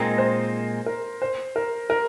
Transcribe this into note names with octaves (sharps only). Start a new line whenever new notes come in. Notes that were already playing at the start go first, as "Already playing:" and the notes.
Already playing: A#2 G#3 C4 D#4 A#4
C5
A#4
C5
A#4
A#4